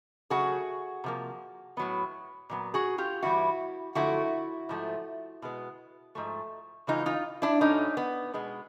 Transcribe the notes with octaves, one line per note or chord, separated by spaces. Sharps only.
C#3 F#3 A3 F#4 G#4
C3 F3 A#3
A2 F#3 B3
A#2 F#3 B3
F#4 G#4
F4 G4
G2 E3 G3 B3 E4 F#4
F#2 D3 F3 A3 E4 F#4
G#2 F3 A3
B2 G#3 B3
G#2 F3 A3
C#3 E3 G#3 B3 D#4 F4
D#4 F4
D4 E4
A2 F#3 A3 C#4 D#4
B3
B2 G#3 B3